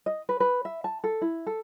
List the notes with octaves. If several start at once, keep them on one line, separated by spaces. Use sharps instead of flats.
D#5
B4
B4
E5
A5
A4
E4
A4